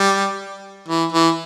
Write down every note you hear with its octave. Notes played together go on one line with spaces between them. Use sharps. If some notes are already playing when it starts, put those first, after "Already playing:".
Already playing: G3
E3
E3